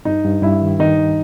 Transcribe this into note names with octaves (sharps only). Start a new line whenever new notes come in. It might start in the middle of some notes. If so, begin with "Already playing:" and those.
G2 D#4
G2
G2 E4
D#3
D#3 D#4
D#3